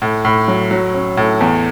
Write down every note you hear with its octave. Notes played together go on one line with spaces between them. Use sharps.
A2
A2
F#3
F#3
C#4
A2
E2